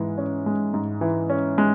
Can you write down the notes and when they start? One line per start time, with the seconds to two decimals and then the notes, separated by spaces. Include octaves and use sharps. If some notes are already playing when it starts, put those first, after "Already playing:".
Already playing: G#2 E3 G#3
0.18 C#4
0.46 G#3
0.74 G#2
1.01 E3
1.30 C#4
1.58 G#3